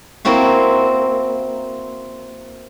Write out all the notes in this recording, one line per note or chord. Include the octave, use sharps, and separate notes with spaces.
A#3 C4 E4 F#4